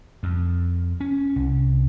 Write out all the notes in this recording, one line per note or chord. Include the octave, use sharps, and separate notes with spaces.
F2
C#4
C2